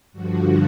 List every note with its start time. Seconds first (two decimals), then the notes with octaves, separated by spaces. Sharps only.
0.12 G2 D3 F3 F#4